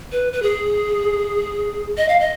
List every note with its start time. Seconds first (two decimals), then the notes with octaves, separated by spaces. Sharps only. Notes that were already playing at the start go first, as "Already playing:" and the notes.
0.12 B4
0.33 B4
0.42 G#4
1.97 D#5
2.09 F5
2.20 D#5